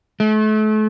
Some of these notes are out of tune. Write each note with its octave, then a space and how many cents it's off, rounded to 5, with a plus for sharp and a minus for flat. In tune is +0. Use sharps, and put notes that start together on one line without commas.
A3 -35